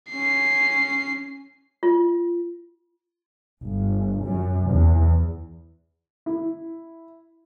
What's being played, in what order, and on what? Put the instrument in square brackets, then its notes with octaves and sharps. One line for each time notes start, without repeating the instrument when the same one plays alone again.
[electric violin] C#4 C7
[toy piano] F4
[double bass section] G1
F#2
E2
[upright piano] E4